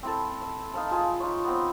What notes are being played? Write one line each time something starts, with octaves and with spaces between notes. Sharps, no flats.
C4 E4 A4
E5
D#4 F5 A5
F4 G#4 E5
D#4 F4 C#5
B3 C4 C5